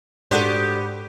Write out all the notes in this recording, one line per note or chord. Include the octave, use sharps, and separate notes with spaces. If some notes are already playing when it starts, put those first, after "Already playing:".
G#2 B3 D4 F#4 G4 A4 C5